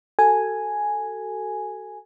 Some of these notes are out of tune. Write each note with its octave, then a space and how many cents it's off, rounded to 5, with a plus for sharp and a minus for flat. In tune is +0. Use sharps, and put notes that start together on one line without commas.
F#4 +40 A4 +15 G#5 +0